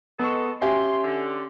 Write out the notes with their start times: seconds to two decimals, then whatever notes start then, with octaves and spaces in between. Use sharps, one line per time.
0.19 G#3 B3 A4 C#6
0.62 C#4 G4 E5 G#5 C6
1.04 D3